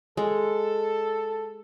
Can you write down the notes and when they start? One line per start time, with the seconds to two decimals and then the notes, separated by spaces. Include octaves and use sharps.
0.17 G#3 A4